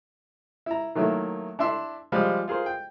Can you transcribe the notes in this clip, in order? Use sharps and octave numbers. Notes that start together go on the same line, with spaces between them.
E4 A#5
D#3 F#3 A3 A#3 E4
D4 E4 E5 C6
F3 G3 G#3 F4
F4 G#4 A#4 C5
G5